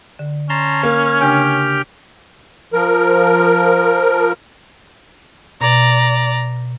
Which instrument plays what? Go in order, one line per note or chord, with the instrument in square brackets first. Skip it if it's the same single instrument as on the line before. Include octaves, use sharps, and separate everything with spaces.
[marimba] D3
[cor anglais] C#4 [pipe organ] A5 A#5 C6
[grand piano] A#3 [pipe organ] F6 G#6
[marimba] C#3 D4 G#5 [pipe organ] G4 G5 F6
[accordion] F3 A#4
[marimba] B2 [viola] D5 A#5